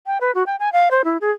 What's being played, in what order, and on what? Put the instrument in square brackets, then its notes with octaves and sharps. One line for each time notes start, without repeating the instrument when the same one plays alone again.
[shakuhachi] G5
B4
F#4
G5
G#5
F5
C5
E4
G#4